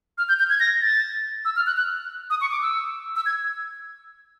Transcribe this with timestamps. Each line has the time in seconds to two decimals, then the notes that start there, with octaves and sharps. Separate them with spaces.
0.18 F6
0.29 G6
0.39 G6
0.50 G#6
0.60 A#6
0.82 A6
1.45 E6
1.56 F6
1.67 F#6
1.77 F#6
2.30 D#6
2.41 C#6
2.51 D6
2.62 E6
3.16 E6
3.26 G#6